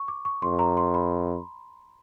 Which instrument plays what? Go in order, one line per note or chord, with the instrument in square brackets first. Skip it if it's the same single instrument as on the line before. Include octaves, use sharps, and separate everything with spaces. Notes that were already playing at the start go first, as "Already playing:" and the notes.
Already playing: [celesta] C#6
D6
C#6
[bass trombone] F2 [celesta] C6
[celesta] A#5
C6
B5